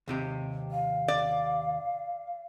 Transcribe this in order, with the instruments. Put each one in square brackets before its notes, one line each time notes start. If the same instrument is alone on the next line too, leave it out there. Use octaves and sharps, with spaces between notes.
[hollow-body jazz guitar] D#2 C3 G4
[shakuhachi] F5
[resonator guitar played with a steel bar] D5